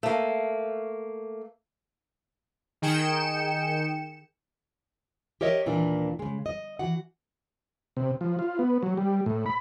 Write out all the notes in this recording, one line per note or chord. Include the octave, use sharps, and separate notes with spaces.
A3 A#3
D#3 G#4 G5 C#7 E7
G4 A#4 C#5 D#5 E5
D#2 A#2 E3 A#3 D4
C#3 G#3
D#5
E3 F#4 F#5
C3
F3
F4
B3
F#3
G3
A2
B5